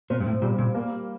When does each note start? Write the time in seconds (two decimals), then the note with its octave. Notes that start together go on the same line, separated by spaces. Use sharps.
0.10 A#2 C4
0.20 G2
0.26 A2
0.42 A#2 G3
0.58 A#2
0.75 A#3